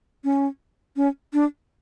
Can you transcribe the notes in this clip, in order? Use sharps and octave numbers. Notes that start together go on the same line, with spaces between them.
C#4
C#4
D4